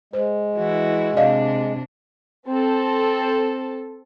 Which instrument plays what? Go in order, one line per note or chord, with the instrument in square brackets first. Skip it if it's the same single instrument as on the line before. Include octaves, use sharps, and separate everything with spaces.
[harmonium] G#3 [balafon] C5
[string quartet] E3 E4 F#4
[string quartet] C3 D4 [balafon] D5 D#5 F5
[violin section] C4 A4